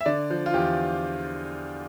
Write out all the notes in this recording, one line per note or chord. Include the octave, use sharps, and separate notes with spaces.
E5
D3 D5
F3
F4
E2 G4